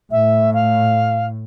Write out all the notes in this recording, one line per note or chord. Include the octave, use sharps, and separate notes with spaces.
A2 E5
F5